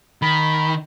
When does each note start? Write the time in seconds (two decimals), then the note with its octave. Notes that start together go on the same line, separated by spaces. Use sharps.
0.22 D#3 B5